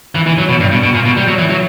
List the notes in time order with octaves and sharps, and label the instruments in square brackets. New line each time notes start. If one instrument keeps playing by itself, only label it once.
[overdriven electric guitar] E3
E3
F#3
B2
G2
B2
B2
A#2
B2
G3
F#3
E3
F#3